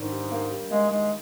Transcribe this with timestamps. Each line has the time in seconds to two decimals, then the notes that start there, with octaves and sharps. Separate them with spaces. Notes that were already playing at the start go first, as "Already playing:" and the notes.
Already playing: G#2 D#3 D4
0.11 G3
0.31 A#3
0.50 G3
0.70 G#3 A#3
0.90 D#3 G#3